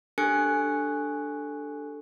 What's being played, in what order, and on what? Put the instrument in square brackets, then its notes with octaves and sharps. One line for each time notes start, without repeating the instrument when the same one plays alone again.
[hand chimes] D4 G4 A4 G#5 F#6 C#7